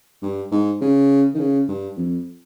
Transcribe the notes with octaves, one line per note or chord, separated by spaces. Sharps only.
G2
G#2
C#3
D#3
C#3
G2
F2